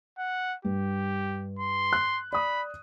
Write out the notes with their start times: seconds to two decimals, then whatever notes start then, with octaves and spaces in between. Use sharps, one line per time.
0.18 F#5
0.65 G2 G4
1.59 C6
1.93 F#6
2.33 D5 B5 D#6